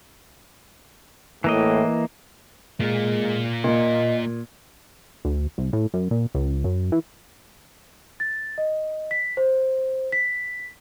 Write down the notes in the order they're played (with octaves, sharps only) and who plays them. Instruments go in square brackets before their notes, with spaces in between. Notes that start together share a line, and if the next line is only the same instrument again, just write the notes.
[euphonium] A2 [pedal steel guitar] E3 A#3 D#5
[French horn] G#3 [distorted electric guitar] A#3 F4
[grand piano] A#2 [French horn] D#5
[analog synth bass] D2
C2
A2
F#2
A#2
C#2
F#2
E3
[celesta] A6
D#5
B6
C5
B6